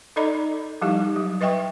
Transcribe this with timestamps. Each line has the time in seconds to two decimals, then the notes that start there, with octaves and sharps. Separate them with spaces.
0.16 D#4 A4 D5 D#5 A#5 B5
0.82 F3 G3 D#4 E4 G4
1.16 F#3
1.41 B4 D#5 E5 G5 C#6